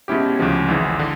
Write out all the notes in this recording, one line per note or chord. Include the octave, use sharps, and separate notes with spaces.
B2 G#3 C#4 E4 G4
D2 C#3 F3 G#3
G#1 G#2 E3
D3